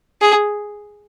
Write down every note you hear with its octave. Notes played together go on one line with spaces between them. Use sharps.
G#4